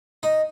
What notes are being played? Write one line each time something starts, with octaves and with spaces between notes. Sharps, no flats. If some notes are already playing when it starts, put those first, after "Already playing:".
D#4